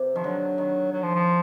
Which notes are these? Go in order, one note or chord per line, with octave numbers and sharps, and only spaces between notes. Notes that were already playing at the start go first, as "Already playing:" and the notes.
Already playing: C3
D#3 F3
D3 F#3
D#3
F#3
F3
F3